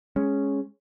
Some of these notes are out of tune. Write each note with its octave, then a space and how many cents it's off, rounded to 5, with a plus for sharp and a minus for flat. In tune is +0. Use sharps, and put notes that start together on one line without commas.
G#3 +0 C#4 +0